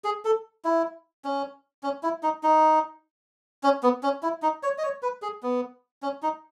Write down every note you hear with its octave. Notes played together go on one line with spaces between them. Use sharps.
G#4
A4
E4
C#4
C#4
E4
D#4
D#4
C#4
B3
C#4
E4
D#4
C#5
D#5
C#5
B4
G#4
B3
C#4
D#4